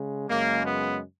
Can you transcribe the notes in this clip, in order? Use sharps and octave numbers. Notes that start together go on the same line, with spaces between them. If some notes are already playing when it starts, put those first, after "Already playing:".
Already playing: C#3 G#3
F#2 C#3 G#3 A#3
B3